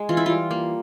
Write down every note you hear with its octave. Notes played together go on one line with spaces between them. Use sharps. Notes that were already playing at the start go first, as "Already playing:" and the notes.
Already playing: G#3
E3 F4
E4
G3 F4
A#3